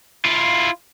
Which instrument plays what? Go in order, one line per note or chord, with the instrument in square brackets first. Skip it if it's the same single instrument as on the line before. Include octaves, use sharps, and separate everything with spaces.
[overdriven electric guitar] E4 F4